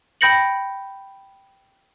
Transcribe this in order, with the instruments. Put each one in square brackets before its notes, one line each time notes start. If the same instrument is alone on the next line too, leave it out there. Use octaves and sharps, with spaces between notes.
[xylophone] G5 B5 G6 A#6 C#7 F#7